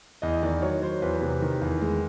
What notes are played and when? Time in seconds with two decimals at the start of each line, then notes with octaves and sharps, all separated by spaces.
0.22 E2 D#5
0.43 D#3 D5
0.62 F#3 C#5
0.82 F#3 C5
1.02 E2 B4
1.22 C3
1.42 D#3
1.61 E2
1.81 G#3